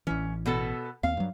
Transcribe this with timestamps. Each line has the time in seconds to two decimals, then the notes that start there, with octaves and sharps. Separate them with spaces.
0.07 A1 E3 C#4
0.46 B2 B3 A4
1.03 D#2 C4 F5
1.17 G2 F#3